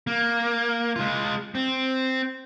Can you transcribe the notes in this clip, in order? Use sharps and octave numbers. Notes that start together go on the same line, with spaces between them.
A#3
G#3 F4
C4